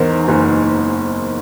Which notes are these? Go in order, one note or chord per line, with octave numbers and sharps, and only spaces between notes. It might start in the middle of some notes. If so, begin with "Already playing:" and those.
Already playing: E2 G#2 A#4 C5
F#1